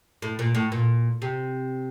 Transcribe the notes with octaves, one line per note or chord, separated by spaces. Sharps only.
A2
A#2
A2
A#2
C3